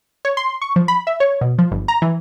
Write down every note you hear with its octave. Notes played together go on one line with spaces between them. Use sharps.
C#5
C6
C#6
F3
B5
E5
C#5
B2
F3
G1
A#5
E3